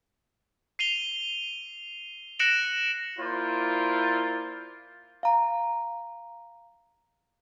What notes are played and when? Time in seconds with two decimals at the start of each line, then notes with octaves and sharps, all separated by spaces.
0.79 C7 D#7 F7 G7
2.39 F#6 A#6 C#7 D7 E7 F#7
3.19 A#3 E4 F4 C5 D5
5.23 F5 A#5